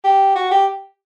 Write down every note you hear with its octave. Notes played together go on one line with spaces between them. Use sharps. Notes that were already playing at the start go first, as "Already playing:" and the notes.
G4
F#4
G4